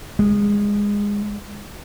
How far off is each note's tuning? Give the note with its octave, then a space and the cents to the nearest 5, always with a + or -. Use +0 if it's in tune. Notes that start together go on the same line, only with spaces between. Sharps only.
G#3 -20